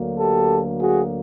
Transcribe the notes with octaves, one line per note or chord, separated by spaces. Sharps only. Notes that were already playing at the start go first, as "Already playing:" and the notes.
Already playing: D2 D3 F#3 A#3
G4 A4
F#4 G#4